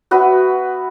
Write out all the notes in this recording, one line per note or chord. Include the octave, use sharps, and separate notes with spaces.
B3 F#4 B4 E5